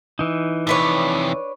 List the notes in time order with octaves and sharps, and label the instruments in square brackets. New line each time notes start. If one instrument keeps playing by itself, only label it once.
[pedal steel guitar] E3 D#4
[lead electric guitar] F2 C3 [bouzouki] D4 B4 C#5